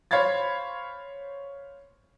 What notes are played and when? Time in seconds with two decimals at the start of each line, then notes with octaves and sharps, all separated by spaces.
0.11 C5 C#5 F5 B5 G#6 A6